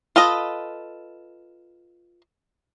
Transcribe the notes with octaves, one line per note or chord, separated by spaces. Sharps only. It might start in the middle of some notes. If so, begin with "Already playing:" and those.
F4 A4 B4 D#5